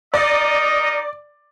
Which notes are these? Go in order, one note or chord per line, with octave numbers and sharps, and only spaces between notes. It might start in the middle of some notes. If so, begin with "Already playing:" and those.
D#4 A#4 D5 D#5